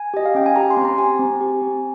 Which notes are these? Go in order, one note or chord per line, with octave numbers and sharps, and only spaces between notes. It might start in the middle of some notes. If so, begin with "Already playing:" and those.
Already playing: G#5
G4 D#5
F5
C#4 G5
G#5
G4 A#5
C6
C4
A#5
G4 G#5
C4
G4
C4